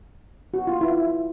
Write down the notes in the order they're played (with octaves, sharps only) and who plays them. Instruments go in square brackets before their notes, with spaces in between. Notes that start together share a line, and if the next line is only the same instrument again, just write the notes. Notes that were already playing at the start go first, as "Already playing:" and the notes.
[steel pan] F#4
F4
E4